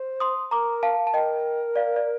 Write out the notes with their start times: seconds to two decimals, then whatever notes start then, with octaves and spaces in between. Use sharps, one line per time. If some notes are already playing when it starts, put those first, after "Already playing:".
Already playing: C5
0.20 C6 D#6
0.51 A#4 A#5 D6
0.83 F5 A5
1.07 A5
1.13 A#4 D#5 G5
1.76 D5 F5
1.96 D5